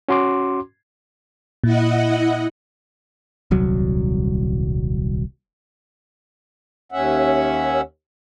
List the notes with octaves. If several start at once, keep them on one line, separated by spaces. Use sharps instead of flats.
C#4 F#4 C6 D6
A#2 E4 D#5 F#5
D#1 C2 F#3
D#2 C#4 E5 F#5